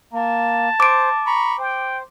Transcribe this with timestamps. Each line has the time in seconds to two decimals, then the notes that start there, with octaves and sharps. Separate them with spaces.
0.13 A#3 A5
0.80 C5 D6 D7
1.26 A#5 B5 C#6
1.58 C5 G5